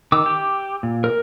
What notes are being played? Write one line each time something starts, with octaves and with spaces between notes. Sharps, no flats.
D#3 D6 E6
G4
A#2
A#4